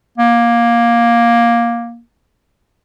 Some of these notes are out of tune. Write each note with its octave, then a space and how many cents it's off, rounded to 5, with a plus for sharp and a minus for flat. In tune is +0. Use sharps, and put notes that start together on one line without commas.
A#3 +10